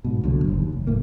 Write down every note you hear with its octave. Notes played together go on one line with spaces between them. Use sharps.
G#2 B2
C2 A#2 D3 F#3
F#1
D#2
F1
F#1 D2 A2 A#3